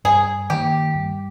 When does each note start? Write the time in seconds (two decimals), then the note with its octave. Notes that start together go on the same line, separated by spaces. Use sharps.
0.04 G2 G#4
0.50 D#3 A#3 G4
0.94 G2